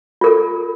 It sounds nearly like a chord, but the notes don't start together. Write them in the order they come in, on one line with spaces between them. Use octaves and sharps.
F4 A#4 A4